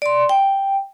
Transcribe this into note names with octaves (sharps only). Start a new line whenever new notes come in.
D5 C6
G5